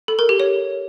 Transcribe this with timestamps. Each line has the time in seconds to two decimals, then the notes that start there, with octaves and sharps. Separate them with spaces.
0.08 A4
0.19 A#4
0.29 G4
0.40 C#5